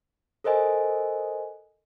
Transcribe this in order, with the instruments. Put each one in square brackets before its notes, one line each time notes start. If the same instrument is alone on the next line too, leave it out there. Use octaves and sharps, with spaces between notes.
[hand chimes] A4 A#4 C5 D#5 G#5